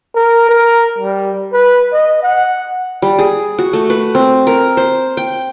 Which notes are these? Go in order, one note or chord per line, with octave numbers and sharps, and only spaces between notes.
A#4
A#4
G3
B4
D#5
F#5
G3
G#4
F#4
A3
B4
C4
A#4
C5
G5